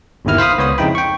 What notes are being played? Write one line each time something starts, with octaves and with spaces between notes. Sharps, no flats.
G1 D#2 B2 D#3 E4 F6
C5 F5 B5 D#6
C#2 B3 C5 C#5 B5 D#6
F2 C#3 D#4 E4 G5 B5
G5 C#6